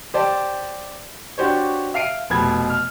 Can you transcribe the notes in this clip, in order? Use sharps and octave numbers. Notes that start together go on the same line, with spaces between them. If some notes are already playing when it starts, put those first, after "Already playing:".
G4 C5 D5 A5
D4 F#4 G4 C5 C#5
E5 F5 C7 D7 D#7
F1 B2 B5 G#6
F6